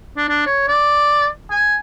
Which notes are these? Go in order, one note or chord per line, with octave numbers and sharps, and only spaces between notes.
D4
D4
C#5
D5
G#5